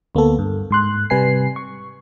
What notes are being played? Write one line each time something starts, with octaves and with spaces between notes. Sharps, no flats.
D2 A#3 B3 A4
G2
G#2 C6 F#6
C3 G3 B4 G#5 C7
C#6